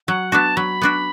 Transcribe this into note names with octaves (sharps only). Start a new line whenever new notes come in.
F#3 F#5
B3 D4 F#4 A5
F#3 B5
B3 D4 F#4